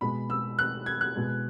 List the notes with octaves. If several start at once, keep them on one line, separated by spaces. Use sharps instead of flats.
B2 G#3 B5
E6
F#6
G#6
F#6
B2 G#3